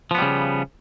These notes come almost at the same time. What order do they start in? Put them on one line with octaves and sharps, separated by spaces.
F3 B3 G3 C#3